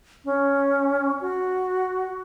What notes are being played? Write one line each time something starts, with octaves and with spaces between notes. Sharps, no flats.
C#4
F#4